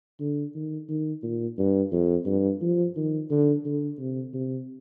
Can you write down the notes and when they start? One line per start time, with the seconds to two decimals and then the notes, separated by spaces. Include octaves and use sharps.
0.20 D3
0.55 D#3
0.89 D#3
1.23 A#2
1.58 G2
1.92 F2
2.26 G2
2.61 F3
2.96 D#3
3.30 D3
3.65 D3
3.98 C3
4.34 C3